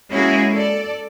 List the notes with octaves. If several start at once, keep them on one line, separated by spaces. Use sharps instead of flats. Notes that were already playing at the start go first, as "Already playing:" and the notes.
G#3 A#3 C#4 E4 F#4 G#4
A4 D5